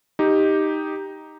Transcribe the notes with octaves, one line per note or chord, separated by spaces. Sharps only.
D#4 G4